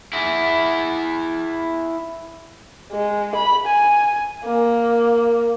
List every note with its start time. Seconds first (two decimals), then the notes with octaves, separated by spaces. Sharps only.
0.13 E4 G#4
2.92 G#3
3.35 B5
3.66 G#5
4.44 A#3